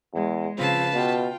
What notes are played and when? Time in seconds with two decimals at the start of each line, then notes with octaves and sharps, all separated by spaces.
0.14 E2 G#3
0.57 C#3 F3 C4 B4 F5 A5
0.93 B2 F4 G5